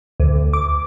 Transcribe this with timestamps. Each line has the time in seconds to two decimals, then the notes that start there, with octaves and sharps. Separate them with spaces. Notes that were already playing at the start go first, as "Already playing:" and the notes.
0.20 D2
0.53 D6